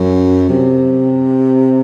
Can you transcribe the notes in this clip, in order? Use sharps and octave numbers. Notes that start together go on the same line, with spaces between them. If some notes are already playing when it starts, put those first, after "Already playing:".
Already playing: F#2
C3